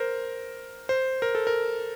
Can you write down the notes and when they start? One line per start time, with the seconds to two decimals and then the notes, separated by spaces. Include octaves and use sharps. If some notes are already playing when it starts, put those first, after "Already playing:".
Already playing: A#4 C5
0.89 C5
1.22 A#4
1.35 A4
1.47 A#4